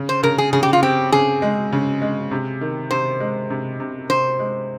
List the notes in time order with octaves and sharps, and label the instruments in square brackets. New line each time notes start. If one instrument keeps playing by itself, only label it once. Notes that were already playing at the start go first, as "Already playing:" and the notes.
Already playing: [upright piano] C#3
[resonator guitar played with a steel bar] C5
[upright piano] C#3 [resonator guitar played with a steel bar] A#4
[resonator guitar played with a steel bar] G#4
[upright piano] C#3 [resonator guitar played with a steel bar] G#4
[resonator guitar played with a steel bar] G4
F4
[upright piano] C4 [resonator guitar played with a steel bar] G4
[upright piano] C#3 [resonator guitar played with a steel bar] G#4
[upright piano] G#3
C#3
G#3
C3
D#3
[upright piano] C3 [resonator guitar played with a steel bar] C5
[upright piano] G#3
C3
C3
[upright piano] C3 [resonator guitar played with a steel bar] C5
[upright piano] G#3